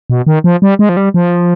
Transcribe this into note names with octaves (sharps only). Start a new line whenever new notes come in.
B2
D#3
F3
G3
G#3
F3
G3
F3